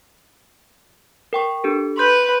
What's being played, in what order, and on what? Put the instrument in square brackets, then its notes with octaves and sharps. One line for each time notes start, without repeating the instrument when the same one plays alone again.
[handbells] A#4 G5 C#6
D4 G4 A4
[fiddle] B4 [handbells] C6 G6